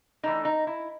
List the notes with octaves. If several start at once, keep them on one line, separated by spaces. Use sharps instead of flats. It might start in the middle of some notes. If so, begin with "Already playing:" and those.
E3 A3 D4 D#4
D#4
E4